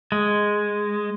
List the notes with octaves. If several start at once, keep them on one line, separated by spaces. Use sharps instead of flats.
G#3